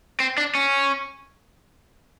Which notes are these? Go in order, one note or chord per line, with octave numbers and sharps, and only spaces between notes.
C4
D4
C#4